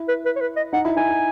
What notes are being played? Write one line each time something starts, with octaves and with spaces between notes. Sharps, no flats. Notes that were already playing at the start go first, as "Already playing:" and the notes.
Already playing: E4
B4
B4
C#5
B4
D#5
D#4 F#5
E4
D#4 G#5
E4